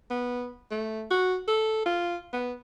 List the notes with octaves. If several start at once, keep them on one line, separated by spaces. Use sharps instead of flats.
B3
A3
F#4
A4
F4
B3